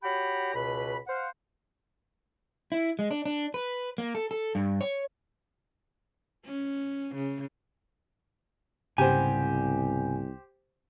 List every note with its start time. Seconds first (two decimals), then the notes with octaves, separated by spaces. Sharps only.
0.04 F#4 G4 C#5 G5 A#5 B5
0.54 C#2 B2 B4 B5
1.08 C5 F5 F#5
2.72 E4
2.99 G#3
3.11 D4
3.25 D4
3.54 B4
3.98 A#3
4.15 A4
4.31 A4
4.55 G2
4.81 C#5
6.45 C#4
7.16 C#3
8.98 C2 G#2 C#3 B3 G4 C5 G#5